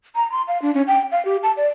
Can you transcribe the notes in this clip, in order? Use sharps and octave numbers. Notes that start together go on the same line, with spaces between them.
A#5
C6
F5
D4
C#4
G5
F5
G4
A5
D5